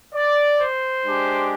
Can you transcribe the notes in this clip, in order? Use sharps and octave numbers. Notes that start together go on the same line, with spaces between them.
D5
C5
G#3 D4 G4